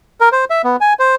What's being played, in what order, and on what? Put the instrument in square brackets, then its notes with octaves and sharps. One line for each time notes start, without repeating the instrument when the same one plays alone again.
[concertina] A#4
C5
E5
B3
G#5
C5